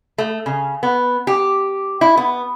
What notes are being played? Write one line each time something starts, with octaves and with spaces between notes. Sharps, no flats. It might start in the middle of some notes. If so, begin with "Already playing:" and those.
A3
C#3
B3
G4
E4
B3